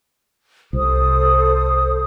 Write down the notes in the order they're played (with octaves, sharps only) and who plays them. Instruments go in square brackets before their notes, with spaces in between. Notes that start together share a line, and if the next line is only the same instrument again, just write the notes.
[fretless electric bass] C2 [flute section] A4 C5 D#6